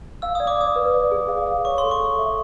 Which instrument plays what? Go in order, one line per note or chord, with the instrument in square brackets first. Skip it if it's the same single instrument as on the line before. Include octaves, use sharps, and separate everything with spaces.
[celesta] F5 [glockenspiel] E6
[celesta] D5 [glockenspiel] D#6
[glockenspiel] D6
[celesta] D5 [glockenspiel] D#6
[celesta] B4
D5
G#4
F5
F5
[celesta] C#5 [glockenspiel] C#6
[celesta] A4 [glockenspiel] C6
[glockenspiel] C#6
[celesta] A4
E5